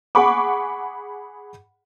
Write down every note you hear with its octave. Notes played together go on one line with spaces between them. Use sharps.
G#4 F#5 B5 C#6 D6